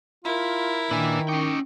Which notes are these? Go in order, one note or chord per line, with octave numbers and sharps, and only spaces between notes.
E4 F4 A#4
A#2 D#3 D4 B4 G#5 E6
C#4 D#4 G5 C#6 D6